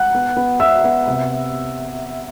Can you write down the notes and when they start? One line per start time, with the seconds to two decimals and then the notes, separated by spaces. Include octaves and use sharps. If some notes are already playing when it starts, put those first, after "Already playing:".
Already playing: F#5 F#6
0.15 B3
0.37 B3
0.60 B3 E5 E6
0.84 B3
1.07 C3